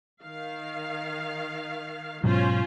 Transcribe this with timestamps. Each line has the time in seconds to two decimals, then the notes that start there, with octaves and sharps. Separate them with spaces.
0.22 D#3 F5
2.24 G#2 B2 F#3 C#4 F4 C5